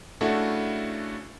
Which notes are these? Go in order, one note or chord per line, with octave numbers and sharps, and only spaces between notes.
C#3 A3 D4 E4 F#4 A4